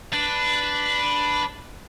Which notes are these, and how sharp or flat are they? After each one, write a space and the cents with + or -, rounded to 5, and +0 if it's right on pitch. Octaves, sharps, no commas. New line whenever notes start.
D4 +0 B4 +0